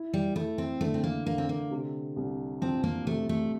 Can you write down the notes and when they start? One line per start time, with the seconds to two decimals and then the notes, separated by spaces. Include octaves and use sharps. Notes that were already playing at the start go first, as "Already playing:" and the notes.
Already playing: E4
0.14 G3
0.36 A3 E4
0.58 C4
0.81 D3 A3
0.94 C4
1.04 A#3
1.26 D3 A#3
1.38 C4
1.49 A#3
1.71 C3
2.16 C2
2.61 F3 C4
2.84 A#3
3.06 C3 A3
3.29 A3